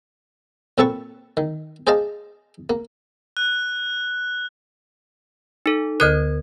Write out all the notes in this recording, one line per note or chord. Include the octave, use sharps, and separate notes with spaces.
A#2 C4 A4 B4 A5 C#6
D#3
G#4 C5 D5 D#5 F5 A5
A#3
F#6
D#4 A4
D2 D3 A#4 F#6 G#6